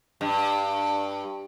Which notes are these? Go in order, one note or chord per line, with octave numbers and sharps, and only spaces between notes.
G2